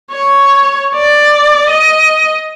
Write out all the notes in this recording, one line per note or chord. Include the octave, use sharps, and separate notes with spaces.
C#5
D5
D#5